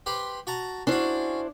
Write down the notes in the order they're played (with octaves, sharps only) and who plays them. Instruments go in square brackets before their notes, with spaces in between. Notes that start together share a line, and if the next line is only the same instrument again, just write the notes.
[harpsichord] G4 B4 C5
F#4 A5 A#5
[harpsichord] C#4 F#4 [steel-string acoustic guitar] D4 E4 C5